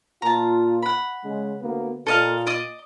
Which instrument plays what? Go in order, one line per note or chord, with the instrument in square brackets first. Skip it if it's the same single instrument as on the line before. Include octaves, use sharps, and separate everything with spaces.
[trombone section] A#2 F4 [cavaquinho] A5 A#5
[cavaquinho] F#5 B5
[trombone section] C#3 G#3
D2 A#3 B3
[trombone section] A#2 [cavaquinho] A4 D#5 F5
[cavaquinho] D5 D#5 D#6